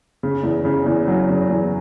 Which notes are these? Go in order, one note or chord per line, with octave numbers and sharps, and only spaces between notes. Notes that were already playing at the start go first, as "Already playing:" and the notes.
C#3
E2
C#3
E2
F#3
C#3
E2